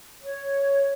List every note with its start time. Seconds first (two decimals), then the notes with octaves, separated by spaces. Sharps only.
0.22 C#5